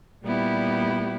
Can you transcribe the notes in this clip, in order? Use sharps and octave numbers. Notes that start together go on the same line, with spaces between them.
A#2 G3 B3 E4 G4